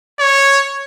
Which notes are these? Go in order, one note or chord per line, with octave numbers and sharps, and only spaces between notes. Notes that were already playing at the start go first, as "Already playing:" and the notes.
C#5